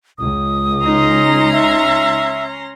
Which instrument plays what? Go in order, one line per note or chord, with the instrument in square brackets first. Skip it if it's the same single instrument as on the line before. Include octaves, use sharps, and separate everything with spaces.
[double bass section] C#2 [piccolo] D#6
[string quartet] C#4 A#5 C6 [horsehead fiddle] D#4
[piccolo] E5